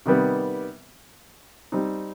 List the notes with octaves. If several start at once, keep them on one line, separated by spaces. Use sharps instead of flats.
C3 D#3 G3 B3
G3 C4 D#4